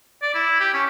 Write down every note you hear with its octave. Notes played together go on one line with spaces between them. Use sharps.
D5
E4
G4
C#4